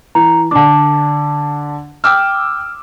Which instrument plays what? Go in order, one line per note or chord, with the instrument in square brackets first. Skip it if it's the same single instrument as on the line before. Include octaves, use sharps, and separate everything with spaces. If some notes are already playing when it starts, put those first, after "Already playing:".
[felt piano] E3 [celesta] A#5
[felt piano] D3 D4 [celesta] A5 D6
[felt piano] G5 D6 E6 [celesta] F6